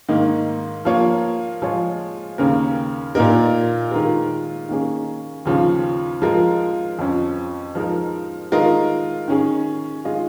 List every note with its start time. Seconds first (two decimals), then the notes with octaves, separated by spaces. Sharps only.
0.08 G#2 D#3 A#3 D#4
0.85 F3 A#3 F4 C#5
1.62 F3 G#3 F4 G#4 C#5
2.38 D#2 C#3 A#3 C#4 A#4
3.15 A#2 A#3 D#4 A#4
3.92 D#3 G#3 F4 A#4
4.69 D#3 A#3 C#4 G#4
5.45 D#2 C#3 F3 C#4 F4
6.22 F3 G#3 F4 A#4
6.99 F2 F3 C#4
7.75 F3 G#3 D#4 A#4
8.52 D#3 G#3 F4 A#4 D#5
9.28 D#3 C#4 G#4
10.04 D#3 G#3 F4 G#4 D#5